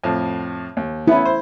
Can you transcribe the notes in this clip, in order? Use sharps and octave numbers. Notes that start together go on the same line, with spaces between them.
F2 A2
D#2
B3 C#4 E4
C5